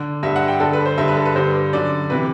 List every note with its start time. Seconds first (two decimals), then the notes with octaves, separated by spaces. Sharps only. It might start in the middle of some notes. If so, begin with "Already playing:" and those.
Already playing: D3
0.23 G2 D3 E5
0.36 F#5
0.48 G5
0.60 G2 D3 A4
0.73 B4
0.85 C5
0.98 G2 D3 E5
1.08 B4
1.17 A4
1.26 B4
1.35 G2 D3 C5
1.73 F#2 D3 D5
2.10 C3 E3 B4